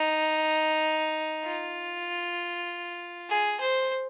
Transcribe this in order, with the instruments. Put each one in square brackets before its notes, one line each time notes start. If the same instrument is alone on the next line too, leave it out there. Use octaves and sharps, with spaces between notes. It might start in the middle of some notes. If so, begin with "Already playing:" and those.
Already playing: [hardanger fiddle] D#4
F4
G#4
C5